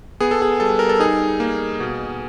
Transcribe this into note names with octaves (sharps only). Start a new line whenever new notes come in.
B3 G#4
A4
G#4
G3 A4
A#4
A4
D#4 G#4
A#3
B2